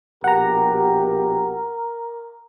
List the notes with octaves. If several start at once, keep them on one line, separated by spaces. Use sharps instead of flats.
A#1 B2 G4 A#4 F#5 A#5